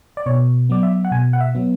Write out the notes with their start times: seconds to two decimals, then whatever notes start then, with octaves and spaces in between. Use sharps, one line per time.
0.17 D5
0.26 B2 C#5
0.69 F#3 B3 D5
0.83 E5
1.05 F#5
1.12 B2 G#5
1.33 F#5
1.41 E5
1.55 F#3 B3